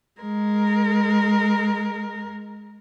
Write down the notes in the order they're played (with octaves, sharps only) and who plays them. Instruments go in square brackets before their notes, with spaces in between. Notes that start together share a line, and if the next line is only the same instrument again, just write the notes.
[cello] G#3 A#4